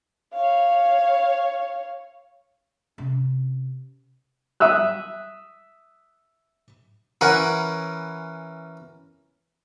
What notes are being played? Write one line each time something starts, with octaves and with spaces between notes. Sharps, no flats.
C#5 F5
C3 C#4
E5 D#6 E6 F#6
E3 C#4 A#4 B4 F#5